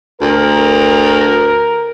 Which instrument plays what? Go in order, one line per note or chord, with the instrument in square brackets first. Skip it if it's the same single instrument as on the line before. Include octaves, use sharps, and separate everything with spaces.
[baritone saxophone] D2 [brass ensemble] A#4